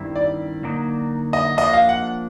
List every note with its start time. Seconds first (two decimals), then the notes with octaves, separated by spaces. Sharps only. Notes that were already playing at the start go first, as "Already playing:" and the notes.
Already playing: G2 D#3 G3 C4 E4
0.16 D5
0.63 D3 F#3 A#3 D#4
1.33 D#5
1.57 F3 A#3 D4 D#5
1.73 F5
1.89 F#5